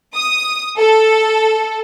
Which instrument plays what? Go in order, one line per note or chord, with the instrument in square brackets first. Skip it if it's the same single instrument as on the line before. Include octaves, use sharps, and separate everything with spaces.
[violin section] D#6
A4